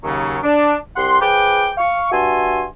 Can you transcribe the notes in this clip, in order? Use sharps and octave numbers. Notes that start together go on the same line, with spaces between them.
D#2 C#3 F#3
D4
C2 G4 F#5 C6
F3 G#4 B4 G5 D6
F5 C#6
G2 F#4 E5 G#5 A5 C6